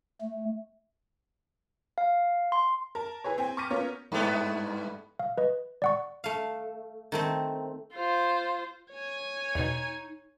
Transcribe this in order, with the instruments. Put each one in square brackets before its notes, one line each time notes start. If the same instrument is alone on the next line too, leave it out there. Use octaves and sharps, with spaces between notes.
[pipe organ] A3
[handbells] F5
C6
[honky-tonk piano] A#4 A5
E4 G#4 B4 C#5
C4 G5 G#5
C#6 D6 F6 G6 A#6 D#7
B3 C#4 F4 A#4 C#5
[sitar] G2 A3 B3
[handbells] F5
B4 D#5
D5 F#5 C#6
[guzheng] A3 F5
D#3 A3 C4
[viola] F4 C5
[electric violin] C#5 G#5
[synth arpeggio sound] E2 B2 [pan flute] D#4